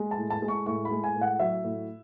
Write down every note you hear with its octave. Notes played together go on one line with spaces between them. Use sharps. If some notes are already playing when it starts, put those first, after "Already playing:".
Already playing: G#3
A5
A2
A5
G#3
C#6
A2 C#6
B5
G#3
G#5
A2
F#5
F#3 E5
A2